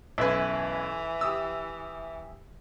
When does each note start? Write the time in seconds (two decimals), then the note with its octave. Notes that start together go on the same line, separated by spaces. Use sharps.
0.18 B1 F#2 E3 B4 E5 G#5
1.21 G4 D#6 E6